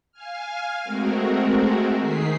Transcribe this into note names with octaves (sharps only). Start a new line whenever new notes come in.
F5 G#5 F6
G#3 A3 C4 F#4 A#4
D#3 D#4 G#4 B6 C7